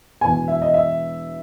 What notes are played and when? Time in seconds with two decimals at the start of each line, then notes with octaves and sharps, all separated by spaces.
0.21 E1 E2 B2 G#5
0.48 E5
0.62 D#5
0.74 E5